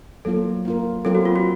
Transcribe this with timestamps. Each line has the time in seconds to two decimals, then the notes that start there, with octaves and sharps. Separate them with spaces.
0.25 F#3 A#3 F4 A4
0.65 A#3 F4 A#4
1.05 F#3 C4 F4 A4 A#4
1.15 F#4
1.25 F4
1.36 F#4